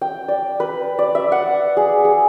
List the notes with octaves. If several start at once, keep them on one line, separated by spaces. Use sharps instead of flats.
G5
D5
B4
D5
E5
F#5
G#4
G#4